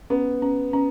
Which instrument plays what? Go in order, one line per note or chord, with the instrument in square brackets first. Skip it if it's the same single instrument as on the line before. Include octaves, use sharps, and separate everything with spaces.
[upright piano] B3 [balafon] C#4
[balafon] C#4
C#4